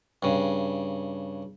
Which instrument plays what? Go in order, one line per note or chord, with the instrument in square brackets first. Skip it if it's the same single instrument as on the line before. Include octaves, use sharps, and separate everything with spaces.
[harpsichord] G2 C#3